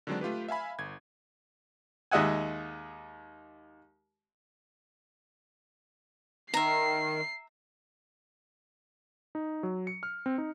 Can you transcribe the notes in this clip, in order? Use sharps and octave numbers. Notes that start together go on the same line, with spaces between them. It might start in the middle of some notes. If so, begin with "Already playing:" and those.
D3 D#3 F#3 G#3 C4 D4
A3 F4 G4 B4
E5 F5 G#5 B5
G1 G#6
D#2 G#3 D#5 E5 F#5 G#5
D#3 E5 A#5 C7
D#4
F#3
C#7
F6
C4
D#4